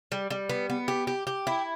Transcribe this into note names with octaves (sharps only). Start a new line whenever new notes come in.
G3
G3
B3
B3
G4
G4
G4
E4